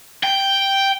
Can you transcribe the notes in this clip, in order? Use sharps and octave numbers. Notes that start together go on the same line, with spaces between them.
G5